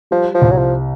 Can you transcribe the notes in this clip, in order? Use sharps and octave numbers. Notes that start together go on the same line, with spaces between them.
F3 G3
F3
C2
F#3
F3